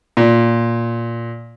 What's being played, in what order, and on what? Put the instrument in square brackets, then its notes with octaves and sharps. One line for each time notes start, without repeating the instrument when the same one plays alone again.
[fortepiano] A#2